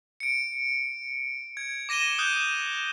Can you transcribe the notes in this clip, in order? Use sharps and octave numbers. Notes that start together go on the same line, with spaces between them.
C#7 D7
G#6
D6 A#6 D#7 E7 G7
D#6 F#6 G6